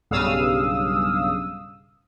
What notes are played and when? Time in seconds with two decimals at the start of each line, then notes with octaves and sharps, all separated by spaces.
0.11 B1 G2 C#3 F5 D#6 E6